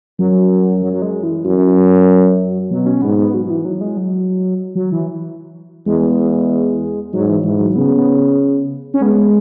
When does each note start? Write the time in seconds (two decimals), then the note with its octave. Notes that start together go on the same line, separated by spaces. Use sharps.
0.19 F#2 F#3
0.82 F#3
0.93 F#3
1.02 G#3
1.23 E3
1.45 F#2 F#3
2.71 B2 F#3
2.86 C#4
3.02 G#2 B3
3.18 B3
3.34 F#3
3.46 F#3
3.50 E3
3.65 F#3
3.81 G#3
3.97 F#3
4.75 F#3
4.92 E3
5.86 E2 G#3
7.13 G#2 F#3
7.29 E3
7.44 G#2 E3
7.59 F#3
7.76 C#3 B3
7.97 B3
8.94 C#4
9.01 G#3 B3